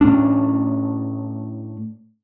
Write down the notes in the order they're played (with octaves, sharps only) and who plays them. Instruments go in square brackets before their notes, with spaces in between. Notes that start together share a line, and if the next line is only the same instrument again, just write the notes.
[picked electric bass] A2 A3 C#4 D4